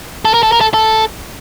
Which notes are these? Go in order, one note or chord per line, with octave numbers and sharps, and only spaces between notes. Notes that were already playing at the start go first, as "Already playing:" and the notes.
A4
A#4
A4
A#4
A4
A4